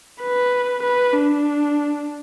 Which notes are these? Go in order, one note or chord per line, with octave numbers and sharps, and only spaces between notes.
B4
B4
D4